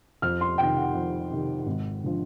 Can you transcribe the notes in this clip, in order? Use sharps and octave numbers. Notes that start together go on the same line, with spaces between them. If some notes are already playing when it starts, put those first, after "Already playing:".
F2 F6
C6
C3 D#3 G5
F#5
F2
C3 D#3
G#1
D3 F3